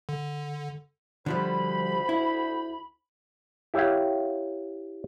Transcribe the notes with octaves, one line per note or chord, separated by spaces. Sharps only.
D3
D2 D3 F3 G3 C5 B5
E4
E4 G4 C#5 F5 F#5